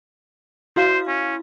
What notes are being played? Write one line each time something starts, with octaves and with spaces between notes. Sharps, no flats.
E4 F#4 C5 F5
C#4